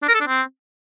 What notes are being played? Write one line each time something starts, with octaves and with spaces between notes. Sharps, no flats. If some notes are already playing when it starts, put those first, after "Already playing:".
D4
A#4
A4
D4
C4